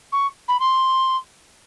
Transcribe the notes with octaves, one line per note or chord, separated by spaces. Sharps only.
C#6
B5
C6